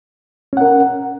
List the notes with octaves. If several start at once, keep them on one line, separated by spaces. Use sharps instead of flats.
C#4 A#4 F#5